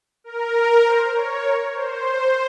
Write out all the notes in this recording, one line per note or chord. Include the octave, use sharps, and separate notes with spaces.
A#4
C5
C#5
A#4
C5